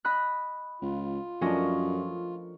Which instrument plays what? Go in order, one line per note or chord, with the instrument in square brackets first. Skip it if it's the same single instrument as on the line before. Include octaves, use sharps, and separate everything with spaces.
[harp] D#5 B5 F#6
[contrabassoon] C#2 [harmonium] F4
[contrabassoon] F#2 [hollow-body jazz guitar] F3 A3 D4 [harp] C#4 A#4 D#5